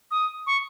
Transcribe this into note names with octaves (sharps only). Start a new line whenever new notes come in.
D#6
C#6